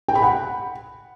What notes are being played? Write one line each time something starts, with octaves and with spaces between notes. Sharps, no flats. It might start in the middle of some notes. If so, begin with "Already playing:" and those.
G5
B5
F#5